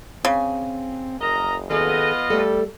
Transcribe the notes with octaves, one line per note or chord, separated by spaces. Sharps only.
C#3 C4 G#5
F#1 A#4 D#5 A#5
D#3 B3 F4 G#4 A4 D#5
G3 A3 A4